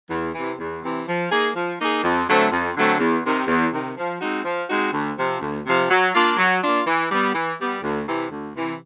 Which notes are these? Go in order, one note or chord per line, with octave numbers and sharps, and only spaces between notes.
E2
C3 E3
E2
C3 E3
F3
A#3 D#4 G#4
F3
A#3 D#4 G#4
F2
D3 F#3 A3 C4
F2
D3 F#3 A3 C4
E2
C3 D#3
E2
C3 D#3
F3
G#3 C4 D#4 F#4
F3
G#3 C4 D#4 F#4
D2
C3 F3
D2
C3 F3
F#3
A#3 D4 F4
F#3
A#3 D4 F4
E3
G3 B3
E3
G3 B3
D2
C3 E3
D2
C3 E3